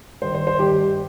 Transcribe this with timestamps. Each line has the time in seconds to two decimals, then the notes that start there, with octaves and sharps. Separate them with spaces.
0.22 G2 D#3 C5
0.34 C5
0.47 C5
0.59 G2 D#3 G4